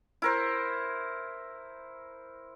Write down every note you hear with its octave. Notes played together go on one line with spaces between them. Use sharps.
E4 A#4 C5